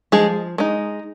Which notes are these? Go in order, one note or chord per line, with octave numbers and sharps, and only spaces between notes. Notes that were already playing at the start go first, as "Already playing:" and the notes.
F3 G#3 G#4
G#3 D#4